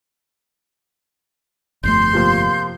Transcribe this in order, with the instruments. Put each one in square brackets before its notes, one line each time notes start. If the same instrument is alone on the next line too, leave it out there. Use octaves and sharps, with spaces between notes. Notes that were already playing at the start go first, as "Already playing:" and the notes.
[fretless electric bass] G1 F2 A3 [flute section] C6 [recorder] G6
[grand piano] C3 F3 A#3